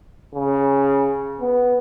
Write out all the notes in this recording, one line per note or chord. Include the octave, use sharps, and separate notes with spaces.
C#3
B3